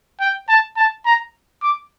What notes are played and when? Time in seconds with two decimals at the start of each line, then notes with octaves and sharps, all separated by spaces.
0.20 G5
0.49 A5
0.77 A5
1.05 A#5
1.62 D6